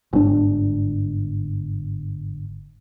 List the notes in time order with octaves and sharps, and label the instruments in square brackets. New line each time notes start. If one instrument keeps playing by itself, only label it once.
[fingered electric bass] G1 G#2 D4